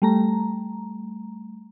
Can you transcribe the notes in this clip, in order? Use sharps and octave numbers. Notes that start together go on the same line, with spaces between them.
G3 A3 A#5